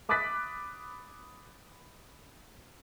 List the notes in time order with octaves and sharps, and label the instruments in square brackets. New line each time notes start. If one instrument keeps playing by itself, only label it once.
[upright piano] B5 D6 D#6 F#6 A6 B6